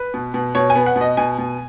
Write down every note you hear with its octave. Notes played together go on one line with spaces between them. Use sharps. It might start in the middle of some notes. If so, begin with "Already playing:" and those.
Already playing: B4
B2
B2
B2 C#5
G#5
B3
F#5
B2
D#5
B2 G#5
B2